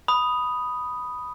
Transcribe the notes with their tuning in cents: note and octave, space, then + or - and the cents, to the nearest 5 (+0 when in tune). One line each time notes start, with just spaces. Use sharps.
B5 +0 D#6 +0